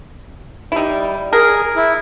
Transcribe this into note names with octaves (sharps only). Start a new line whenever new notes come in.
G3 D#4 E4
G#4 A#4
E4